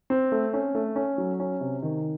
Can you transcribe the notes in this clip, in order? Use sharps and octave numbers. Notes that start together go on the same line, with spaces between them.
C4
A3
C#4
A3
C#4
F#3
C#4
C3
D#3